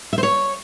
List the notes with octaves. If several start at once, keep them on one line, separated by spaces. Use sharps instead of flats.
E5
C5
C#5